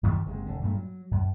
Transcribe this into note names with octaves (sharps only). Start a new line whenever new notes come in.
F#2 D#3 F3 G3
F#1 C3 G#3
E1 D3
G2 A#2 A3
F#3
F#2